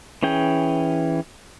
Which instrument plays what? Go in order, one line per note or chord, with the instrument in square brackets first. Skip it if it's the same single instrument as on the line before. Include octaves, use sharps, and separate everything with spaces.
[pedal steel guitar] E3 C#4 G#4 G5